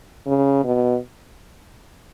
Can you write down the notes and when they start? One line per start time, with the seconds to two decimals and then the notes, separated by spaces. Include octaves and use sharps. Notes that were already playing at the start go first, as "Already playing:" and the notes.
0.27 C#3
0.64 B2